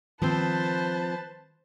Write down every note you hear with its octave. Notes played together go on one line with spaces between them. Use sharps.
D#3 F3 G3 B3 C4 B4 C5 A5